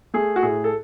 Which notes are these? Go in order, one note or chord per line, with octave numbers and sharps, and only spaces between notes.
A3 G#4
F#4
A2 G#4
A4